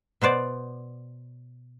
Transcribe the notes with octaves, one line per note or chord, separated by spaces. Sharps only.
B2 B3 C5 D5